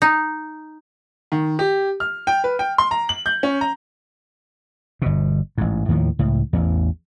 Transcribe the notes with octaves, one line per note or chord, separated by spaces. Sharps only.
D#4
D#3
G4
F6
G5
B4
G5
C6
A#5
F#7
G6
C#4
A#5
G1 B2
A1 G#2
D#2 A2 D#3 F3
C#2 A2
A1 E2